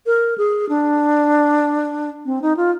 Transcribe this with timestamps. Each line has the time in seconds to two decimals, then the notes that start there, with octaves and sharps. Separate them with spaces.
0.06 A#4
0.38 G#4
0.69 D4
2.26 C4
2.42 D#4
2.57 F4